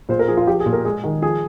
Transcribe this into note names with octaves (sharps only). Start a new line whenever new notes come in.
A#2 C5
A#4
F3 G#4
F4
F3 G4
G#4
A#2
A#4
G#3 G#4
D#3
F3 G#4